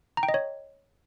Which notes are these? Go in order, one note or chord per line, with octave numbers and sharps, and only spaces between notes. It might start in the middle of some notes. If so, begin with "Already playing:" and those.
A#5
G5
D#5
C#5